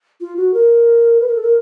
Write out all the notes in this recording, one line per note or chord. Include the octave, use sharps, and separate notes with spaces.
F4
F#4
A#4
B4
A#4
A4
A#4